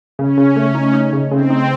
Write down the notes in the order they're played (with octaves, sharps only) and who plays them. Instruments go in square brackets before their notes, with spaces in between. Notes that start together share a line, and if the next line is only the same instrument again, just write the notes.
[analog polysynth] C#3 [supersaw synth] C#4
[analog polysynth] C#3
A3
D#4
D#4
C#3
[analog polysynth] C#3 [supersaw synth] C4
[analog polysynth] D#4